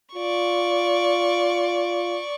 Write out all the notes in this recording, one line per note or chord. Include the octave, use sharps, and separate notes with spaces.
F4 D5 C#6